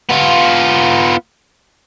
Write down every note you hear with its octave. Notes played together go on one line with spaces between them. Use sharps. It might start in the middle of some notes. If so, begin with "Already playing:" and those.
B3 F4